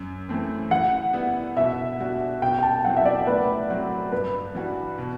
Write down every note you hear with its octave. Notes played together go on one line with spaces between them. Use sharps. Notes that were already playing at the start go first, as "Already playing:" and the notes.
Already playing: F#2
E3 A3 C4
E3 F#5
G3 B3 E4
B2 E5
G3 D4 F#4
B2 G5
G5
A5
F#3 C4 E4 F#5
E5
D5
A2 B4
F#3 C4 F#4
G2 B4
E3 G3 D4 F#4
B2